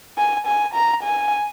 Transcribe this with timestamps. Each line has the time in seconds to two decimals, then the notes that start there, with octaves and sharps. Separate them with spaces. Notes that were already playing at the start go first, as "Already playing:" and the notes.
0.18 G#5
0.46 G#5
0.74 A#5
1.03 G#5